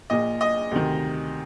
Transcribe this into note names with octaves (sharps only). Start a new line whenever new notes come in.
A#1 A#2 D#5
D#5
D2 C3 D#3